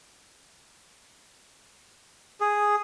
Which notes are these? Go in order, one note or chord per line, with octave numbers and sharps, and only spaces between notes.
G#4